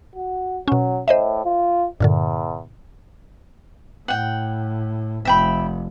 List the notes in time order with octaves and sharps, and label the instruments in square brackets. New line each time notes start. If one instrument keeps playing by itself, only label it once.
[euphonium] F#4
[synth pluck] B2 C#4 [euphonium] F#3
[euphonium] A2 [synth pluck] C5 D#5 E5
[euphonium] F4
[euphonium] E2 [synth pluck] G2 A#2 D3
[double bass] A2 [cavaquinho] F#5 G5
[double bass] F1 [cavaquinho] E5 G5 B5